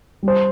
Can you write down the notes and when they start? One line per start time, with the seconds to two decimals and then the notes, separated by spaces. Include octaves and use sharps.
0.23 G3
0.28 C5